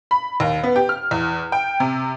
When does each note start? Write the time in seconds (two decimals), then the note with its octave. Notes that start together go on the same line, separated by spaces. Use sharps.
0.11 B5
0.40 D#2
0.63 B3
0.76 G4
0.89 F6
1.11 E2
1.52 G5
1.80 C3